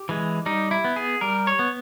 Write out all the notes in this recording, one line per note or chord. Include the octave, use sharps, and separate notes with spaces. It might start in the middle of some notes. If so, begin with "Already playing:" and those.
Already playing: G4
E3 G#3
G3 D#4
E4
B3
G#4
G3 A#4
C#5
B3